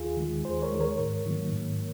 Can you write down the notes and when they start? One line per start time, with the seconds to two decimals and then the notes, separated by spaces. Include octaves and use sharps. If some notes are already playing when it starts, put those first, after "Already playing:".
Already playing: D#2 F4 G#4
0.17 D#3 G#3
0.44 D#2 G#4 C5
0.62 A#4 C#5
0.72 D#3 G#3
0.81 A#4 C#5
0.99 G#2
1.26 D#3 F#3 A#3
1.52 G#2